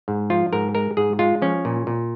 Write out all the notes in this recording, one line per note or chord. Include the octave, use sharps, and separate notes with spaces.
G#2
F3 F4
G#2 A#4
G#3 A#4
G#2 G#4
G#3 F4
F3 C#4
A#2
A#2